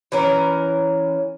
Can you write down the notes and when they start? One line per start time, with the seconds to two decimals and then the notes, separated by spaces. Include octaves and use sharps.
0.12 E3 C#4 A#4